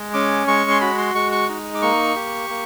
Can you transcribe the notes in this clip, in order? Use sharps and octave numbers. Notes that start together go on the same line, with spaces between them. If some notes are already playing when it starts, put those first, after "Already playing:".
Already playing: G#3
C#4 D6
G#3 C#6
C6
F#4 B5
C6
G#3 C#6
C#6
D#4
D6
A#3 C#6
G4
A#3